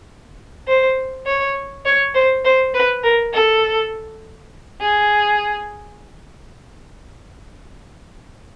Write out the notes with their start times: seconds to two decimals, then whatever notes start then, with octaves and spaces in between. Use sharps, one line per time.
0.68 C5
1.26 C#5
1.85 C#5
2.15 C5
2.44 C5
2.74 B4
3.03 A#4
3.33 A4
4.80 G#4